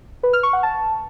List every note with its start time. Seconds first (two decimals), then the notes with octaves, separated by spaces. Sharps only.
0.23 B4
0.33 F6
0.43 C#6
0.53 F#5
0.63 A5